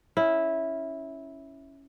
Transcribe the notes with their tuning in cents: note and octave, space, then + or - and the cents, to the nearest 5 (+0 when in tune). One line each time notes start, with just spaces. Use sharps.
C#4 +0 E4 -10